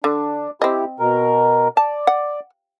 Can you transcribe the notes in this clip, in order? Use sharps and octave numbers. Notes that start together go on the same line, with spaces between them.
D3 D4
C4 E4 G4 D#5
B2 A#4
D5 A5
F#5